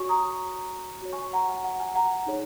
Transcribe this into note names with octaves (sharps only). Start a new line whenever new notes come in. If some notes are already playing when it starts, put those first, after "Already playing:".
Already playing: F#4 C#5 G#5 C#6
A#5 D#6
F#4 C#5
G#5 C#6
F#5 A#5
G#5
F#5
G#5
F#5 A#5
D#4 G#4 C#5